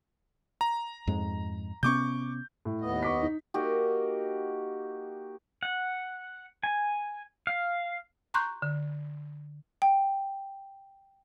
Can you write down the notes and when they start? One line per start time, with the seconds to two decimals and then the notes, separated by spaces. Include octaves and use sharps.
0.61 A#5
1.07 F2 G#2 G#3
1.83 C3 B3 C#4 C#6 D6 G6
2.65 A2
2.81 D#2 B3 D#5
3.03 C#6 D6 B6
3.22 D#4
3.54 A#3 D#4 F#4 G4
5.63 F#5
6.63 G#5
7.47 F5
8.34 A#5 C6 C#6 F#6 G6
8.62 D3
9.82 G5